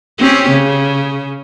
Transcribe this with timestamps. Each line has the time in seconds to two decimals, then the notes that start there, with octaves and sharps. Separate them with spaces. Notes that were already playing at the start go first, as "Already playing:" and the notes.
0.18 C4 C#4 G4
0.49 C#3